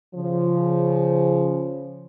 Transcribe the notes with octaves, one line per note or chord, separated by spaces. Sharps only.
C#3 F3